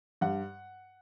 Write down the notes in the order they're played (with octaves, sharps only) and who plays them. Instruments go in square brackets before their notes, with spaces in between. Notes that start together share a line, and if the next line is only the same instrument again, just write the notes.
[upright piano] G2 F#5